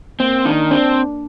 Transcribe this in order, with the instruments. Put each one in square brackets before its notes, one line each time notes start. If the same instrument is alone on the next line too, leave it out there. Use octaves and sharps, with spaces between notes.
[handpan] A#3 [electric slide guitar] C4
[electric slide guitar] D#3 [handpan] D4
[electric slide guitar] C4 [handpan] D4